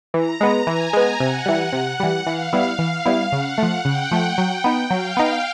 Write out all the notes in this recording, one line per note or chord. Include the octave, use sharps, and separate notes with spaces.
E3 A#5
G#3 B3
E3 G#5
G#3 B3
C3 F#5
E3 G3
C3
E3 G3
E3 F5
G3 B3 E4
E3 F5
G3 B3 E4
C#3 F#5
F3 A3
C#3 G5
F3 A3
F#3 G5
B3 D#4
F#3 F5
B3 D#4